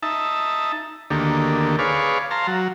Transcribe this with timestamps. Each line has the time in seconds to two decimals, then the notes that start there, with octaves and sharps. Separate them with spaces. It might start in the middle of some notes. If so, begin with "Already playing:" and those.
0.03 D#4 E5 A5
1.10 D2 D3 D#3 A#3 G4 A4
1.79 G#4 B4 C#5 D5 F5
2.31 F5 A5 A#5 C6
2.47 F#3